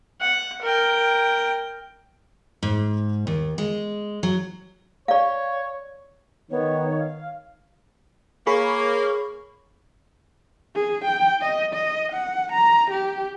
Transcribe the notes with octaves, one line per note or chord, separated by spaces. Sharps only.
F#5
A#4 G5
G#2
D#2
G#3
F#3
C#5 D5 F5
D#3 B3 C#5
F5
A#3 G#4 C#5 B5 C#6
G#4
G5
D#5
D#5
F#5
A#5
G4